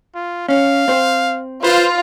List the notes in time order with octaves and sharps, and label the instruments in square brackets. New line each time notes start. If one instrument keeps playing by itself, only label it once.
[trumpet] F4
[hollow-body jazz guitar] C#4 [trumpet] F5
[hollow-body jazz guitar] C4 C5
[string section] F4 [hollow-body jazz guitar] B4 [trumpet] C5